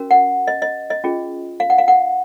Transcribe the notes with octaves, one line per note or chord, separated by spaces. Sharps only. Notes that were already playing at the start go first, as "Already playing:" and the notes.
Already playing: C#4 F#4 A#4
F#5
D#5
D#5
D#5
C#4 F4 G#4
F5
F#5
F5
F#5